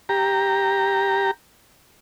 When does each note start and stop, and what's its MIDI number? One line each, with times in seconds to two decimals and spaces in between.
0.09 1.31 67
0.09 1.31 82